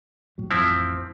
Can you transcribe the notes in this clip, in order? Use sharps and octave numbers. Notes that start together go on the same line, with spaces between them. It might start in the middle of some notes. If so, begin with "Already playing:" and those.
A2 F#3
A1 F2 F3 C4 E4